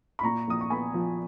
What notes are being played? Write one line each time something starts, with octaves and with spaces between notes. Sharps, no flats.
B5
A#2 A#5 C#6
A#1 D#6
C#6
B3 G#5 B5
F3